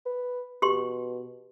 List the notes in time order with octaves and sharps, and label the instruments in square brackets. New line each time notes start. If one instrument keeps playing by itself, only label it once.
[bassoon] B4
[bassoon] B2 [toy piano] G4 C6